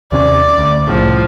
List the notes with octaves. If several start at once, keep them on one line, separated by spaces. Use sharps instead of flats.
D#2 C3 C#4 D5
D2
C2 A2 C#3 F3